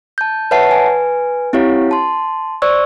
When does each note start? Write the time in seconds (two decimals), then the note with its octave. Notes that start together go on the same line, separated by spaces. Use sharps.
0.18 A5 G6
0.51 B4 C#5 E5 F#5 A5 C7
0.71 B4 G#5
1.53 C4 E4 G4 C#5 F5
1.91 A5 C6
2.62 C5 D5 C#6 E6